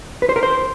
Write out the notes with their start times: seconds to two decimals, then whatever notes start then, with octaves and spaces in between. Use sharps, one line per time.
0.22 B4
0.29 C5
0.36 A#4
0.43 C5